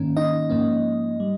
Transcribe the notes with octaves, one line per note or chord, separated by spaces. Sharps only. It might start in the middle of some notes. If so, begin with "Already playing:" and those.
Already playing: G#2 D#3 A#3 C#4
D#4 D#5
G#2 F3 A#3 C#4
G3